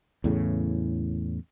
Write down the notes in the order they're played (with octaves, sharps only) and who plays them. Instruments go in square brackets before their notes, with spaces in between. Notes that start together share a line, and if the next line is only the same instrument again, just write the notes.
[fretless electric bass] E2 A2 C#3